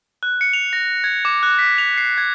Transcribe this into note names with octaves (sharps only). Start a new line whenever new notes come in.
F#6
C#7
F7
A#6
G#6
D6
F#6
B6
F7
C7
G#6